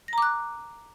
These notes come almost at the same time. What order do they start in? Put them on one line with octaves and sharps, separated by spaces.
A#6 A#5 D6 F#6